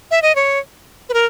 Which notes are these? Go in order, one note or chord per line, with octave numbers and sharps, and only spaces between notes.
E5
D#5
C#5
B4
A#4